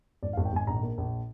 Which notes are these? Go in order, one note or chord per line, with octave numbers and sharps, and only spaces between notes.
G#1 D5
F5
G#1
G5
G#1 G#5
A#1 A#5
A#3
A#1